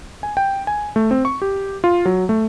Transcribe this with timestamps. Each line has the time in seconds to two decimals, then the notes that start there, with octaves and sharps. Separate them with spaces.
0.23 G#5
0.37 G5
0.67 G#5
0.96 A3
1.11 C4
1.25 C#6
1.42 G4
1.84 F4
2.05 F#3
2.29 A3